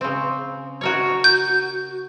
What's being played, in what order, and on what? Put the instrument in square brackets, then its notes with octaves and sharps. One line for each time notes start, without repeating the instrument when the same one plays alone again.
[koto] C#3 C4
F#4 A#4 C#5
[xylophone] G6